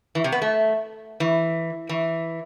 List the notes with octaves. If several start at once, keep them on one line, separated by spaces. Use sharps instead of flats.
E3
C3
B3
A3
E3
E3